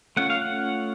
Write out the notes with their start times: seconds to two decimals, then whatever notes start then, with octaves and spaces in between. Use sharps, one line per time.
0.17 A3 C#4 F4 F#5
0.30 F5
0.41 F#5